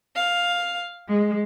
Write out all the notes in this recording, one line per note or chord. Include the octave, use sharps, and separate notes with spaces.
F5
G#3